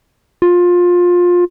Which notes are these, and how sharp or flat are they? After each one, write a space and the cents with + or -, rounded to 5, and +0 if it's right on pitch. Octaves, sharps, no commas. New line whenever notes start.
F4 +20